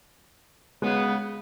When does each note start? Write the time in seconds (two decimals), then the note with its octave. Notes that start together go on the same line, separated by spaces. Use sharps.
0.82 C#3 F#3 G#3 B3